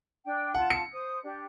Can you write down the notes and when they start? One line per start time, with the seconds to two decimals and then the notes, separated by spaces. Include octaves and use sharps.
0.25 D4 G5
0.54 F4 F#5 A5
0.70 C#7
0.92 C5 D#6
1.23 D4 G4